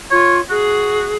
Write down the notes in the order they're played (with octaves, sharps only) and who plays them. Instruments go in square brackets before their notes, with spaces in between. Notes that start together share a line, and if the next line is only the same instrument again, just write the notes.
[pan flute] F4 [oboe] C#5
[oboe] F#4 [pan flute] G#4